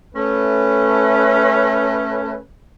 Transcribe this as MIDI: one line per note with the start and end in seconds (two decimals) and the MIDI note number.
0.15 2.35 57
0.15 2.35 61
0.15 2.35 71